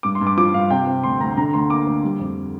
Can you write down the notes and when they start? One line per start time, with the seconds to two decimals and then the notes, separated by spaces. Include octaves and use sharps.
0.03 G2 D6
0.15 C6
0.21 G2
0.27 D6
0.37 F3 D6
0.54 G2 F5
0.70 C3 G5
0.87 C4
1.04 D2 C6
1.20 D2 A#5
1.37 D3 A#5
1.53 D2 C6
1.70 A#3 D6
1.86 D2
2.04 G3
2.20 F2